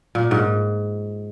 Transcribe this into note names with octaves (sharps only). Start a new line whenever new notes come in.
A#2
G#2